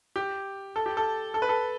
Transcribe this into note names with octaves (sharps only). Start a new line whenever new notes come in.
G4
A4
G4
A4
A4
B4
A4